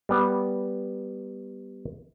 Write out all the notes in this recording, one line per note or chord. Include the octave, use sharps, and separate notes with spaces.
G3 B3